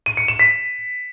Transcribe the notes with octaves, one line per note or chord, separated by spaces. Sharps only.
D#7
C#7
E7
B6